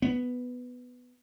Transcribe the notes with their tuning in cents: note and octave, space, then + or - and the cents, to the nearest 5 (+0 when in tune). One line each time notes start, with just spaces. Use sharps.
B3 +5